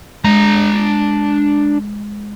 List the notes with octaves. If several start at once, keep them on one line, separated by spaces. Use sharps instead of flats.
G#3 D4 A#5